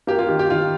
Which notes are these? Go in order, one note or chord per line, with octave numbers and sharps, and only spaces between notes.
A#3 G4
F4
D#3 G4
G4
D#3 F4